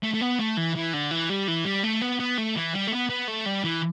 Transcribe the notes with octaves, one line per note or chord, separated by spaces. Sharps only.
A3
A3
B3
A3
E3
E3
D3
E3
G3
E3
G3
A3
B3
B3
A3
E3
G3
A3
B3
B3
A3
G3
E3